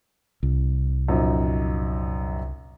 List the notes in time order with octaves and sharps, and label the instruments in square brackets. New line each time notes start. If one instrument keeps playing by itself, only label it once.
[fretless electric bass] C2
[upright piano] A#1 F#2 D#4